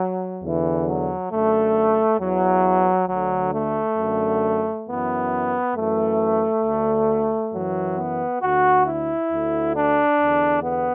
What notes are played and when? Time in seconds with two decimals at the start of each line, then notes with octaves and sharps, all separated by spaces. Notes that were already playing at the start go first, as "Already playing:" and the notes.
Already playing: F#3
0.42 E2 D3 E3
0.87 F#3
1.30 F#2 D3 A3
2.19 E2 E3 F#3
3.09 D2 D3 F#3
3.54 A3
3.98 F#2 D3
4.86 F#2 E3 B3
5.75 F#2 E3 A3
6.64 D2 D3
7.53 F#2 E3 F#3
7.97 B3
8.41 D2 D3 F#4
8.86 E4
9.31 D2 D3
9.75 D4
10.19 E2 D3
10.64 B3